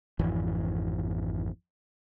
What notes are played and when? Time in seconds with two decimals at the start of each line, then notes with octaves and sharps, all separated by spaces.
0.19 G#1 F2 E3